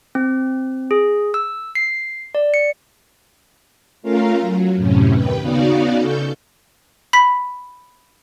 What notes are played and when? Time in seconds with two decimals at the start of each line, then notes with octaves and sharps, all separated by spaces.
0.15 C4
0.91 G#4
1.34 E6
1.75 C7
2.35 D5
2.54 C#7
4.02 A3 C#4 F4 A#4 F5
4.41 F#3
4.75 F#2 A2 C3 C#4
5.12 D#2 B4 G5
5.42 C#3 B3 D#4 F#4 D5 F5
5.96 C#3 A4 C#6 G6
7.13 B5 B6